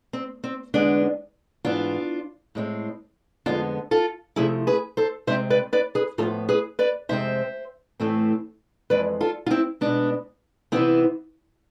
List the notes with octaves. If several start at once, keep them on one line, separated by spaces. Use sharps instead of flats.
C4
C4
E2 D3 G#3 B3 D4
G#2 E3 B3 D4 F4
A2 G#3 C4
F2 D3 G#3 B3 D4 F4
F4 A4
C3 F3 A3 E4 G#4
G#4 B4
A4 C5
C3 G#3 C4 C5 E5
B4 D5
B4 D5
G#4 B4
A2 F3 B3 F4 A4
G#4 B4
B4 D5
F2 C3 G#3 C4 C5 E5
A2 E3 A3 C4
F2 E3 G#3 B4 D5
F4 A4
F4
C4 E4
B2 G#3 B3 D4
C3 E3 B3 C4 E4